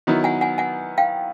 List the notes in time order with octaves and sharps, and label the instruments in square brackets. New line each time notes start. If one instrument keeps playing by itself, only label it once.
[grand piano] D#3 F#3 B3 E4
[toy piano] F#5 G#5
F#5 G#5
F#5 G#5
F5 G5